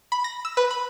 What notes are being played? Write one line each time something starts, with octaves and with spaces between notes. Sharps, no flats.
B5
A#6
E6
B4
B5